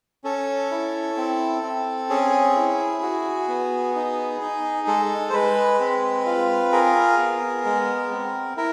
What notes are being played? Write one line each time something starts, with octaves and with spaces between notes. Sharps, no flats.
C#4 A4
E4
C4
C4
C#4 G#4
E4
F#4
B3
D#4
D#4
G#3 A4
C5
G#3 B4
C4
F4
G#4 A#4
B3
G#3
C4
E4 A#4